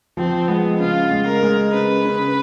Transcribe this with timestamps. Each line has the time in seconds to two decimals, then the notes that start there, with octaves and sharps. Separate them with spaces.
0.17 F3 C4
0.48 G#3 B3
0.80 C#3 F4
1.11 G#3
1.27 A#4
1.43 G#3
1.73 C#3 B4
2.05 C#3